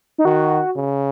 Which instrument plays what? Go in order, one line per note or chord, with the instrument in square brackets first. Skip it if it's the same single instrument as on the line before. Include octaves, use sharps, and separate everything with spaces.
[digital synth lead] D#4
[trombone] D#3 [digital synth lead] F#4
[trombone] C#3